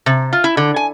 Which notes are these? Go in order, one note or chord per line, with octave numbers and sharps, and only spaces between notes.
C3
F4
E4
D3
G#5